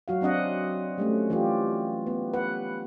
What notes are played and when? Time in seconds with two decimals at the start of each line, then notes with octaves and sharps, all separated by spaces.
0.08 F#3 F#4 F5
0.21 F#3 C4 D4 D#5 F#5
0.98 G3 A3 C#4
1.30 E3 F4 G4
2.07 B3
2.33 B4 F#5